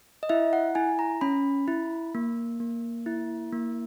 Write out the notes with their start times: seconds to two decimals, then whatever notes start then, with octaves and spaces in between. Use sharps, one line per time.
0.23 D#5
0.29 E4 E5
0.53 F#5
0.75 E4 G#5
0.99 A#5
1.21 C#4 B5
1.68 E4
2.15 A#3
2.60 A#3
3.06 E4
3.52 A#3